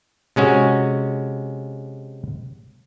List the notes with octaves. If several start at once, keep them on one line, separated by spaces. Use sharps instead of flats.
C3 G#3 C#4 F#4